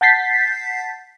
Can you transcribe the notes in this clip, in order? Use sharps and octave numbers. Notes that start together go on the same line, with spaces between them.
F#5 A5 G6 A6 B6 C7